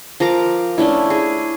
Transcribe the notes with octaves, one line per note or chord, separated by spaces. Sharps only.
F3 A#4 A#5 D6
A3 C#4 D4 E4
G#4